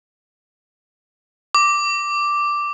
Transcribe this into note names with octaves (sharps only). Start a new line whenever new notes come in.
D6